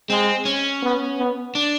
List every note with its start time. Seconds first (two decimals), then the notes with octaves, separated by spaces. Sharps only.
0.10 G#3 C4
0.45 C#4
0.82 B3
1.18 B3
1.55 D4